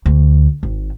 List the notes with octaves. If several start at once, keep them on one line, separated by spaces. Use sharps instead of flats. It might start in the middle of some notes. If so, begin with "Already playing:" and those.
D2
G#1